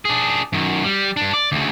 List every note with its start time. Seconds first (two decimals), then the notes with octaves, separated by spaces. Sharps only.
0.05 D4 G#4
0.53 F#2 D#3
0.84 G3
1.17 G2 D4
1.33 D5
1.52 D2 C#3